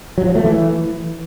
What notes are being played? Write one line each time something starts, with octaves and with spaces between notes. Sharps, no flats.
F#3
F3
A3
E3